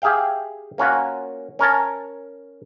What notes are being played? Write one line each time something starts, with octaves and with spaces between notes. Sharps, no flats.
G4 G#4 E5 F5 G5
A#3 C#4 F4 F#4
C#4 A#4 C#5 A5